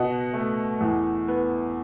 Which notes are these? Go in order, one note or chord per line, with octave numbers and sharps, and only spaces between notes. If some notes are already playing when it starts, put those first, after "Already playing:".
Already playing: B2 D#5 F#5
A3
E2
B3